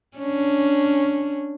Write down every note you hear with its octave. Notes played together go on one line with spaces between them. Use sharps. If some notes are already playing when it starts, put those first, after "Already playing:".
C#4 D4